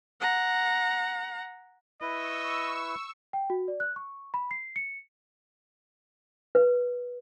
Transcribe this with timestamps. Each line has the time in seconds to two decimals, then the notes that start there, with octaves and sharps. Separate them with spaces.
0.21 F#5 A#5
2.02 E4 B4 D#5 C#6 E6
3.33 G5
3.50 F#4
3.68 D5
3.80 F#6
3.96 C#6
4.34 B5
4.51 C7
4.76 C#7
6.55 B4